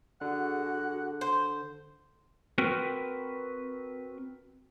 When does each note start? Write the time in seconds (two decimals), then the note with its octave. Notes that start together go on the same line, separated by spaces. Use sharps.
0.21 D3 F#4 G#4 F#5
1.21 C5
2.58 C4 F#4 A#4 B4